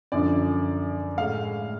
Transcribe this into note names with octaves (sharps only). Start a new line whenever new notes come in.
F#2 D3 F3 D5
A2 G#3 F5